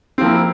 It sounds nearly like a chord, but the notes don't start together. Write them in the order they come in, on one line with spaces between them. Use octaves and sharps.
C4 F3 A#3 E4